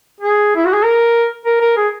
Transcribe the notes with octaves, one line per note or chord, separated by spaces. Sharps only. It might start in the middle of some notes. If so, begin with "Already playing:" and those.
G#4
E4
F#4
G#4
A#4
A#4
A#4
G#4